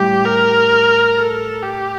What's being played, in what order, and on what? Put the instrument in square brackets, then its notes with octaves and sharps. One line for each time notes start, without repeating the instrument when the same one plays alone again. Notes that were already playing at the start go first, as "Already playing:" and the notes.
Already playing: [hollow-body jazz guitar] A2 G3 [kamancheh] G4
[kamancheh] A#4
A4
G4